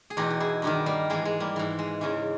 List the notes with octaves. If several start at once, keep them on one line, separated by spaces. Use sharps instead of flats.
G#4
E2 B2 D#4 G4
G4
E4 G#4
G2 D#3 D#4 G4
G3 A#3
G#2 E3 G#3
G#3
G3 A#3
G#2 E3
G#3
E2 C#3 E3